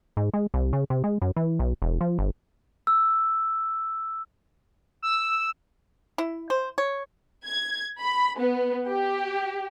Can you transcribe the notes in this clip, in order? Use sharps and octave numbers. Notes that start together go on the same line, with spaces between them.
G#2
G#3
C2
C#3
C3
G#3
F#2
E3
B1
E1
F3
G1
E6
E6
E4
C5
C#5
G#6
B5
B3
G4